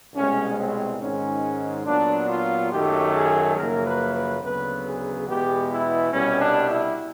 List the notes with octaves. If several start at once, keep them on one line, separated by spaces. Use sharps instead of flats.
C2 B2 G#3 C#4
C4
G#2 D#3 G#3 C#4
A#2 F#3 B3 D4
F4
F#2 D#3 F#3 A3 G4
G#4
F#2 C#3 F3 A#3 A#4
B4
B4
D2 C#3 F#3 B3 B4
G#4
E2 B2 G#3 B3 G4
E4
C2 B2 G3 C#4
D4
E4